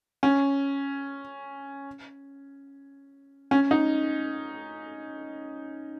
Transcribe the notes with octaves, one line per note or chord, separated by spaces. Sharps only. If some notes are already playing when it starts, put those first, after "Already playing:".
C#4
C#4
D#4